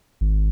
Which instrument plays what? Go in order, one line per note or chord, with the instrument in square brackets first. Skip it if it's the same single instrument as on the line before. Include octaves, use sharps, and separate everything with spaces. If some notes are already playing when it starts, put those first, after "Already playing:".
[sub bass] G#1